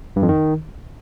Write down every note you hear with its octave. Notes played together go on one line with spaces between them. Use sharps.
G2
F2
D#3